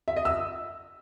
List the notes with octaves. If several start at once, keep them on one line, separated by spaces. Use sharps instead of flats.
E5
D#5
E6